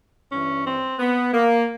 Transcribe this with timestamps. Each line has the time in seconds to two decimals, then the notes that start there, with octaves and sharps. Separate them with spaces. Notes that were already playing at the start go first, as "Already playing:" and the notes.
0.30 G2 E3 C#4
0.65 C4
0.99 B3
1.34 A#3